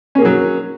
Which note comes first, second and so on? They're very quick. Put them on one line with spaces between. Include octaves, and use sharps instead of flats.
C#4 A#3 G#4 F#3